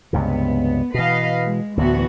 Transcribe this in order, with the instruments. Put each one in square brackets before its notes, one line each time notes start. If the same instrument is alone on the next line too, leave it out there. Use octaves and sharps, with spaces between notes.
[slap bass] C#2 G2 C3 [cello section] B3
[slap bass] B2 E3 [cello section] B4 D#5 F5
[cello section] G#3
[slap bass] D2 A2 [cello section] E3 B3 F#4